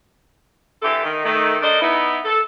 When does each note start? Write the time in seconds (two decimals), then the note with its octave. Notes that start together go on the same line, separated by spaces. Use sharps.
0.83 D3 E3 A3 G4 A4
1.04 D#3
1.25 D#3 A3
1.62 D4 A4 A#4 C5 D5 D#5
1.81 B3 D#4 E4
2.25 A4